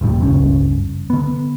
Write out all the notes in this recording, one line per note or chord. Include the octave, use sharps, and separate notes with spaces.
E1 A1 A#2 G3
F#1 C#2 G2 C#4
D3 B3